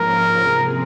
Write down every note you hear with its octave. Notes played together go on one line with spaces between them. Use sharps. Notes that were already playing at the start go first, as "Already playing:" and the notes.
Already playing: G#2 F3 A#3 C#4 A#4
C3 F3 C4 F4 G#4